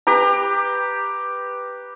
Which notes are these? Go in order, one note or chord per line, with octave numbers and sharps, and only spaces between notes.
G4 B4 A#5